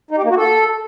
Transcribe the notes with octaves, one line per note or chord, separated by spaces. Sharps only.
D#4
G4
A#3
F#4
A4